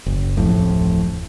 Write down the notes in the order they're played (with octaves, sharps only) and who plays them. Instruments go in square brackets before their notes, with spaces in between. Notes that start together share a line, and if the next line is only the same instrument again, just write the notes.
[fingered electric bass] F#1
D1 A1 F2 A2